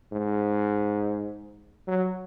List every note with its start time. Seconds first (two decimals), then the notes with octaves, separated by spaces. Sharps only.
0.13 G#2
1.88 F#3